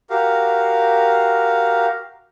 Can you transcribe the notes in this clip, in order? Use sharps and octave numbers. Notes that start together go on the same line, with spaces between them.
F#4 G4 A#4 F5